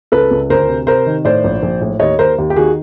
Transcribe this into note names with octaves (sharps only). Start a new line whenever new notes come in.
C#2 A4 B4
C#2
D2 A#4 C5
C3
C3 A#4 C5
D#3
A2 C5 D5
A#1
A#1
A2
D#2 C#5 D#5
D#2 A#4 C5
D#2
G4
D#3 F#4 G#4